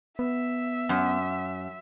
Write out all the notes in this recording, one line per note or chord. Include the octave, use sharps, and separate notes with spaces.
B3 E5
F#2